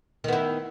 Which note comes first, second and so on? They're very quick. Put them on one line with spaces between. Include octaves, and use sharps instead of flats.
D#3 B3 E4